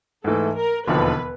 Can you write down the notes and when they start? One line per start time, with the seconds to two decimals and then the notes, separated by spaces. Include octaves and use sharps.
0.24 G#2 E3 A3 A4
0.56 A#4
0.88 E1 D#2 D3 F3 B4